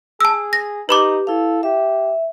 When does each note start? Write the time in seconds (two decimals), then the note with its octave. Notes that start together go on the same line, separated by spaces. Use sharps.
0.21 G#4 A5 E6
0.53 A#6
0.89 D#4 G4 B4 B5 D6
1.27 E4 A4 F5
1.63 G4 E5